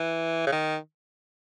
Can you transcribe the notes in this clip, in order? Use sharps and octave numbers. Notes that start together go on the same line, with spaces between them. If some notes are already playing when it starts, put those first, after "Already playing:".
Already playing: E3
C#3
D#3